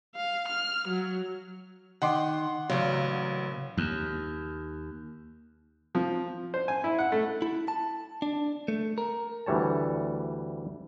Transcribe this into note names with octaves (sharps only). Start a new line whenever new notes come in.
F5
F6
F#3
D#3 F#5 C6 D6
A1 A#2 C#3 F#3
D#2
F3
C5
G#5
E4
F#5
A3
E4
A5
D4
A3
A#4
D2 E3 G3 C#5 A5